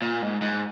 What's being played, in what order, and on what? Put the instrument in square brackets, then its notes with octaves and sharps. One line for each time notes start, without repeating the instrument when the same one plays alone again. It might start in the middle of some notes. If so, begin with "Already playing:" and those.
[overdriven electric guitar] A#2
G#2
G#2